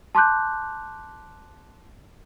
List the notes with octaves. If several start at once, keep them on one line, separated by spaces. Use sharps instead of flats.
A5 C6 D6 F#6 G6